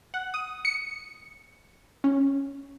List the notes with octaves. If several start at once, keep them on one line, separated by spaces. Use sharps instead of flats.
F#5
D#6
C#7
C#4